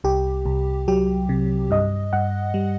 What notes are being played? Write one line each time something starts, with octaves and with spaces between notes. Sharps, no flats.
C2 G4
C2
F#3 G4
C3
G2 D#5
G2 F#5
G3